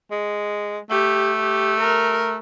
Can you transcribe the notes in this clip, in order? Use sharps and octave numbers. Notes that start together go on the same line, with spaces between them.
G#3
A3 G4
G4
A#4